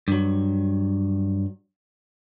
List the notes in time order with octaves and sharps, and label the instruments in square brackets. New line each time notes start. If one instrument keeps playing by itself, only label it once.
[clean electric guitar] G2 F#3